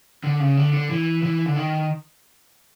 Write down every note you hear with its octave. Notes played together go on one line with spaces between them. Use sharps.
D3
C#3
D3
D3
E3
E3
D3
D#3